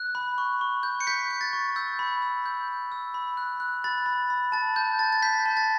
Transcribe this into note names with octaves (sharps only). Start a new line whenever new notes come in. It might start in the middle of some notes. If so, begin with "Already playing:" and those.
Already playing: F#6
B5
C#6
C#6
G6
C#7
G6 B6
G6
A6
C#6
E6 G6
B5
E6
G6
G6
E6
B5
F#6
F#6
B5 A6
B5
B5
A5 A6
A5 G6
A5 A6
A6
G6 B6
A5
A6